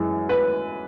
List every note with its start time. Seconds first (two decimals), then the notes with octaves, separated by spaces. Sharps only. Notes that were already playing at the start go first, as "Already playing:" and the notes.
Already playing: F#2 E3 G#3
0.29 B4